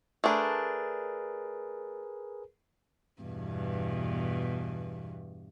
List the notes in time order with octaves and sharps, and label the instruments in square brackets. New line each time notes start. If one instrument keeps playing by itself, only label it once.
[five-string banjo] A3 D4 [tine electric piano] G#4 A#4 B4
[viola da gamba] E2 G2 B2